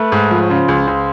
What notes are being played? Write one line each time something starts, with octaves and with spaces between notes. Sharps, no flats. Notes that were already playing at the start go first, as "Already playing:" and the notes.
Already playing: A3 B4
G#2
F3
C#5
C#3 C5
C#2
C#2